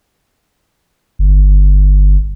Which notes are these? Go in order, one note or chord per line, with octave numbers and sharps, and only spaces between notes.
G1